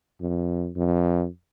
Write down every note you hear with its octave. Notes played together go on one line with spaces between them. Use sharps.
F2
F2